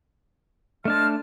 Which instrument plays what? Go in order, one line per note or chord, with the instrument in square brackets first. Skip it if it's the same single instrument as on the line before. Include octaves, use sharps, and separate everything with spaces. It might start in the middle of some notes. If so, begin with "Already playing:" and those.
[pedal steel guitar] A3 D4 A5 [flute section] C5 D#5 F6